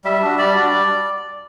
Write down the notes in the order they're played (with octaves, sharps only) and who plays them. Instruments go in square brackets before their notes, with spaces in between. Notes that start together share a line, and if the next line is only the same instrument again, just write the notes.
[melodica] G3 E5
D4 F#4
G3 D5
D4 F#4
G3